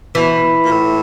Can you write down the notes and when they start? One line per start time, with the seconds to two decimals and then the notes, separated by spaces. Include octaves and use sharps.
0.15 B2 E3
0.65 A#2
0.71 A2